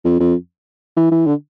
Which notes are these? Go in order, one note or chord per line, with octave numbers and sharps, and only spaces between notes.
F2
F2
E3
E3
D3